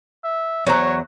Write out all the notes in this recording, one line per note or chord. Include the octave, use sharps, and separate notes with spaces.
E5
E2 F#3 C5 C#5 A#5